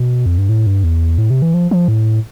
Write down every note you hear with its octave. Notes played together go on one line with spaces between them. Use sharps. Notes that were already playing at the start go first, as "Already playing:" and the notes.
Already playing: B2
F2
G2
A2
G2
E2
A2
C3
E3
F3
F3
A2